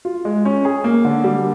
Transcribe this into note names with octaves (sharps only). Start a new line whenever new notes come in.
F4
G#3
C#4
G#4
A#3
D3
G3